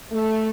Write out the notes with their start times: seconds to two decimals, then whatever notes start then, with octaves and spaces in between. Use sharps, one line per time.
0.12 A3